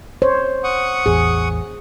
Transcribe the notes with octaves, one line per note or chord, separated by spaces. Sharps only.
C5 C#5
F#5 C#6 D#6
A1 E2 G#4